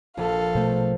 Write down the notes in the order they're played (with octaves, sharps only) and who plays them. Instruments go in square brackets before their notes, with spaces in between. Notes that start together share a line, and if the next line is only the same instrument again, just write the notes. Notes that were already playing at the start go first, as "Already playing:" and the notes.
[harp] A#1 [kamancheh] A4 F5
[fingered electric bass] B2 A3 [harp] C5